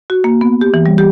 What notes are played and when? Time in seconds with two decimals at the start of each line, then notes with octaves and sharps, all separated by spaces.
0.10 F#4
0.24 A#3
0.41 B3
0.61 G4
0.74 E3
0.86 G3
0.98 G4